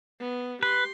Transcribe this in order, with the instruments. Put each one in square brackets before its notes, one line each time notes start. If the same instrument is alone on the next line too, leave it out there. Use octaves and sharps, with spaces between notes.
[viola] B3
[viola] G4 C6 [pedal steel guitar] B4